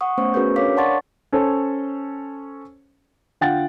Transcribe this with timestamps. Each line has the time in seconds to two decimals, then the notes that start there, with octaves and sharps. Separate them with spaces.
0.01 F#5 C#6 D#6
0.17 A3 B3 C#4 C5 C#6
0.34 C#4 F#4 G#4 A#4 B4 G6
0.56 D4 A#4 C#5 F5 D6 B6
0.77 D5 F#5 A5 C6 C#6 A6
1.33 C#4 A4 C5 C#5
3.41 D3 F4 F#5 G5 A6